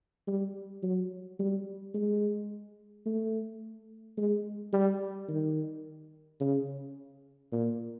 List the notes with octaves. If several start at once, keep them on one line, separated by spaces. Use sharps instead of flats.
G3
F#3
G3
G#3
A3
G#3
G3
D#3
C#3
A#2